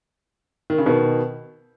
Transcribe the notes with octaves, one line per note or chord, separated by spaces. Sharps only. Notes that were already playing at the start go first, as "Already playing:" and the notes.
D#3
C#3
B2 D#3